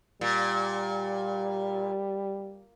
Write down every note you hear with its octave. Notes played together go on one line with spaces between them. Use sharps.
A#2 G3